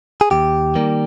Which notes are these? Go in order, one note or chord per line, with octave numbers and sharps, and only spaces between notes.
G#4
D#2 G4
D#3 G3 A#3